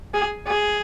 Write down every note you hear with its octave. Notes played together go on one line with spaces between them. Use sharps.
G#4
G#4